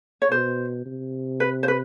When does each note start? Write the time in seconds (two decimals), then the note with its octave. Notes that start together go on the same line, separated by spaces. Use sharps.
0.22 C#5
0.31 B2 C5
0.86 C3
1.40 B4
1.63 C5
1.68 B4